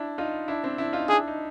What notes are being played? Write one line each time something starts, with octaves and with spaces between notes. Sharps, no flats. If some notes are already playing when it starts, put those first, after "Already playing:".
Already playing: D4 E4
D#4 F4
D4 E4
C4 D4
D4 E4
D#4 F4
D4 E4 G#4
D#4